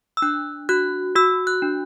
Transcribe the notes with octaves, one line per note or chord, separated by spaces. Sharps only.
E6
D4 F#6
F#4 F#6
F#4 E6
F#6
D4